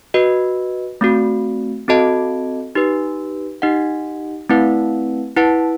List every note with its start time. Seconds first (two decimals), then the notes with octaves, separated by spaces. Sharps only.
0.14 F#4 B4 D#5
1.01 A3 C4 F#4
1.88 C4 F#4 A4 D#5 A5
2.75 D#4 G4 B4
3.62 D#4 G4 D#5 F#5
4.49 A3 C4 E4 B4 F#5
5.37 E4 B4 F#5 A5